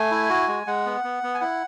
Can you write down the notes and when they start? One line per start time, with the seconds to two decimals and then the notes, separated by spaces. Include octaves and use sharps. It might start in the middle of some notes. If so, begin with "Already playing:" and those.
Already playing: A3 G#5
0.11 E4
0.29 F#4
0.48 G#3
0.67 G#3 F#5
0.86 B3
1.04 B3
1.23 B3
1.34 G#5
1.41 E4 F#5